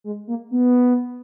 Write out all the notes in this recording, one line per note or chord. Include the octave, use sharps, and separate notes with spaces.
G#3
A#3
B3